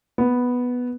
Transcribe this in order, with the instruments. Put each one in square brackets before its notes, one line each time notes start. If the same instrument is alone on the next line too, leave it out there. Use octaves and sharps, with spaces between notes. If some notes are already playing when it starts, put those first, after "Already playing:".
[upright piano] B3